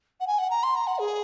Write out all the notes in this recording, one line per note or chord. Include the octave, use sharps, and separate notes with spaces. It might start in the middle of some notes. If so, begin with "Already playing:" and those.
F#5
G#5
F#5
A#5
C6
A#5
F#5
G#4